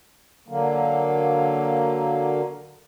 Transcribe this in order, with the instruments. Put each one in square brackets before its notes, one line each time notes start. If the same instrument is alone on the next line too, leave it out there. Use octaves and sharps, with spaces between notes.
[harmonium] D3 F#3 A#3